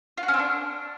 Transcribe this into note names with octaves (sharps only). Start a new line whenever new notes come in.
F4
F#4
C#4
C4
D4